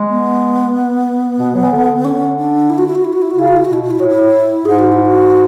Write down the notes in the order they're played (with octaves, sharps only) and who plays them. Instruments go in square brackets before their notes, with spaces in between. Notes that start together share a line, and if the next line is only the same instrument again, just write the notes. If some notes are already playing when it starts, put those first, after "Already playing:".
Already playing: [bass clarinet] G#3
[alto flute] B3
[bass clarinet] B2
F#3
E3
D3
[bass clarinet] D3 [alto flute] C#4
[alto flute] D4
E4
F#4
E4
F#4
E4
F#4
E4
F#4
[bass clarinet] C#3 [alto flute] E4
[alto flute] F#4
E4
[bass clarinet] B2 [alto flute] F#4
[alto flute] E4
F#4
E4
[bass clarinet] A2 [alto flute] F#4
[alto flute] E4
[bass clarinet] G#2 [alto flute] G#4
[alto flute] F#4
E4
F#4